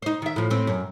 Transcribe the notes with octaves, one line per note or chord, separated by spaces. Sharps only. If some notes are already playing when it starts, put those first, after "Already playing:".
D#4 C5
D#3 E5
A2 F3
A2 C4
F#2